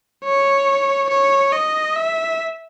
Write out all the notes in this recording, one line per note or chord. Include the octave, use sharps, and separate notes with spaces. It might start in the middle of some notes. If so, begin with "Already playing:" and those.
C#5
C#5
D#5
E5